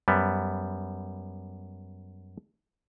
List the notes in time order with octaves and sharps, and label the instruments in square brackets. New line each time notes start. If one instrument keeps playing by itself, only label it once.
[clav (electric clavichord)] F#2 G3 B3